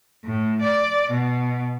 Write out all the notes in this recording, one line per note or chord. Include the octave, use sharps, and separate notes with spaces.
A2
D5
B2